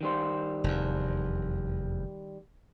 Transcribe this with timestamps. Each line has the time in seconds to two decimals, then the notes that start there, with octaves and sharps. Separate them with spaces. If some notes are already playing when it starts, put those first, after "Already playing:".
0.01 D#3 G3 C5
0.64 F1 E2